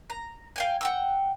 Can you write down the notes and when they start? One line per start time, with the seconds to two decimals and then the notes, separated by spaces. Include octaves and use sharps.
0.10 A#5
0.56 F5 G5 G#5
0.81 F#5 G5 E6